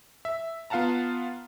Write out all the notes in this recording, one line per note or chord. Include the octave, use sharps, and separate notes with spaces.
E5
B3 F4 F5 F#5 A5 A#5